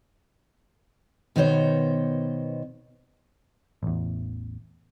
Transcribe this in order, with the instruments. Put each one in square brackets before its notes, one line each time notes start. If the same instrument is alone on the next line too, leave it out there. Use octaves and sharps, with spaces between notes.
[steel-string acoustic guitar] B2 D#3 B3 C5 C#5 D#5
[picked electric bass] A1 E2